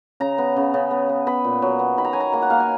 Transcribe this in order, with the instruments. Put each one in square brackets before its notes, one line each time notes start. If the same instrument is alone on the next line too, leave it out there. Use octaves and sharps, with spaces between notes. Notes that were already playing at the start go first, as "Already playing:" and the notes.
[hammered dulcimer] C#3 A#5
B3
C#3
C#3
B3
B3
B3 B5
A#2
F#3
B3
D#3 B5
A#5
F#3 G#5
A#5
A#3 A#5
F#5
A#3 F5
G#5